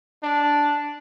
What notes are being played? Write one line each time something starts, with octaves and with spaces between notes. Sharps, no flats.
D4